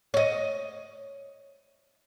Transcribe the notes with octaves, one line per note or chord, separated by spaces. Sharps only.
C#5 D#5